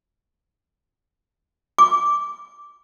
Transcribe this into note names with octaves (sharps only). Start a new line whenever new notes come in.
D6